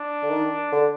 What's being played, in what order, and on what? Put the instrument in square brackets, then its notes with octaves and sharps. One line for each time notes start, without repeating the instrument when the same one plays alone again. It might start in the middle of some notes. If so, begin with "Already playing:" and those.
Already playing: [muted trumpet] D4
[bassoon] D3
D#3
D3